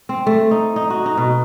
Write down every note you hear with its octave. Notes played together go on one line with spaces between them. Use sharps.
C4
A3
D#4
D#4
F#4
D#4
B2